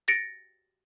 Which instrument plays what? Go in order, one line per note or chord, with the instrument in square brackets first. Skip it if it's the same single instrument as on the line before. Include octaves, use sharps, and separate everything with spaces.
[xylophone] A6 A#6 C#7 D7